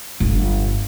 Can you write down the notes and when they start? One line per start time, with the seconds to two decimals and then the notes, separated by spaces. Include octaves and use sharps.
0.20 G1